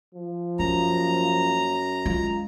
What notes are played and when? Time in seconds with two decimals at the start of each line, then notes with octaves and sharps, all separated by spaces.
0.15 F3
0.59 F#2 A#3 A#5
2.06 G#3 F4